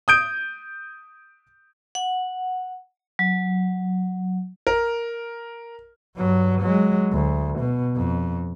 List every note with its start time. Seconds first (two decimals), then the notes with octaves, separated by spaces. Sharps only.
0.08 D#6 G6 D7
1.95 F#5
3.19 F#3
4.67 A#4
6.17 G2 F#3
6.62 F#3 G#3
7.12 D2
7.60 B2
7.96 F2